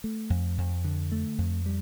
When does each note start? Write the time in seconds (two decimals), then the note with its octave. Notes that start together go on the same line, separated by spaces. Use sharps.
0.04 A3
0.30 F2
0.58 F2
0.85 D3
1.12 A3
1.38 F2
1.66 G3